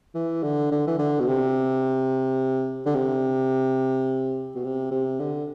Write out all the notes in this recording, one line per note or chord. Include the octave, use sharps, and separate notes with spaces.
E3
D3
D3
E3
D3
B2
C3
D3
C3
B2
C3
C3
D3